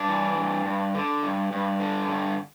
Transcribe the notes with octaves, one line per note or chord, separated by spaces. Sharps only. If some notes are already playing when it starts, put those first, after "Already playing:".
Already playing: G2 D4
E3
G2
G2
D3
G2
G2
D3
G2